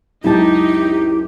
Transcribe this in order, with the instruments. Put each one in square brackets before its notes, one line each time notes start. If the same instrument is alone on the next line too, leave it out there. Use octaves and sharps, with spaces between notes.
[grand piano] C#2 F#2 [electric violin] D#4 [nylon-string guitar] E4 A5 [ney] G4